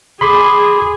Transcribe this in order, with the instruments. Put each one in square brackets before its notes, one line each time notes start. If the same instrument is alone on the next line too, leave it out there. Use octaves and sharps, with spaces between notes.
[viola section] G#4 [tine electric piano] B5 C6 D6